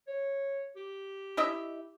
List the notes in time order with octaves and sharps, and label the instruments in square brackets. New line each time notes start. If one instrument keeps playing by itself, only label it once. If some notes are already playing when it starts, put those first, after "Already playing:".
[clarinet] C#5
G4
[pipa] E4 D#5 E5